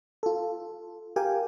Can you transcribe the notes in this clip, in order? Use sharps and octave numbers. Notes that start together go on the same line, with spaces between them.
F4 A4
G4 A#4 F5 G5 G#5